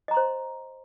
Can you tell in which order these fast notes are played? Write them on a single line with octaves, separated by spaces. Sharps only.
D#5 A#5 C6 C5